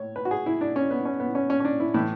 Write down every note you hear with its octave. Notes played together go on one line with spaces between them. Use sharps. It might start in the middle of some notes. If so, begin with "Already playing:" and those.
Already playing: A2 C#5
B4
F#4
G#4
E4
D4
C#4
B3
C#4
B3
C#4
C#4
C#4
D4
E4
A2 E3 E4